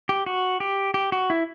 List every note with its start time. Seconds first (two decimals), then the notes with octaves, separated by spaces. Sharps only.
0.09 G4
0.26 F#4
0.60 G4
0.94 G4
1.12 F#4
1.30 E4